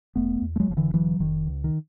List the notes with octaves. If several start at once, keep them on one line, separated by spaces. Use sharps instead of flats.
E1 A3 B3
E2
A3
F#3 G#3
F1 F3
D3 E3
D3 E3 F#3
F1 D#3
C#2
D#3